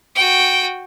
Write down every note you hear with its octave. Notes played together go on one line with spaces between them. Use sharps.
F#4 G5